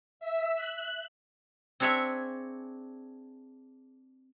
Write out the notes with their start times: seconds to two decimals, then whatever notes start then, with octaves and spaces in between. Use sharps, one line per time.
0.20 E5
0.56 F#6
1.80 C4 D4 G#4 C#5 E5 G#5